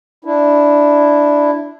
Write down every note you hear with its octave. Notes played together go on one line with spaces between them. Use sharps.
D4 E4